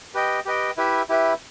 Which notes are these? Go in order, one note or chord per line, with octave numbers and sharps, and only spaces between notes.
G4 B4 D#5 G5
G4 B4 D#5 G5
E4 G4 B4 E5
E4 G4 B4 E5